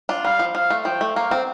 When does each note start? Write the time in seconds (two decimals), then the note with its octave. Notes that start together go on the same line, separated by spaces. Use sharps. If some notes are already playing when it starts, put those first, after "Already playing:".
0.09 D4 F4
0.24 G3 F5
0.39 F3
0.55 F3 F5
0.70 A3
0.85 F3 G5
1.01 A3
1.16 A#3 F5
1.31 C4